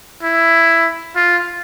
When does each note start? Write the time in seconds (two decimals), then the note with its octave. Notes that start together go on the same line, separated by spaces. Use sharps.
0.23 E4
1.16 F4